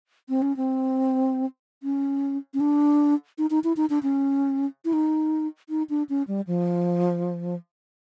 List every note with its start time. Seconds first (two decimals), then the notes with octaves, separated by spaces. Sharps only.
0.29 C4
0.42 C#4
0.57 C4
1.83 C#4
2.54 C#4
2.60 D4
3.38 D#4
3.50 D#4
3.64 E4
3.77 D#4
3.90 D4
4.03 C#4
4.85 E4
4.93 D#4
5.69 D#4
5.90 D4
6.09 C#4
6.28 G3
6.47 F3